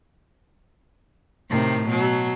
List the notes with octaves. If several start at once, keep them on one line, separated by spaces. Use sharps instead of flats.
A2 C3 D#3
B2 F#3